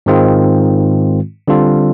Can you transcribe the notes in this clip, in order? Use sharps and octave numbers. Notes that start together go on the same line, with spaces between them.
G#2 D#3 G#3 C4 F4
D3 G3 C4 F4 A4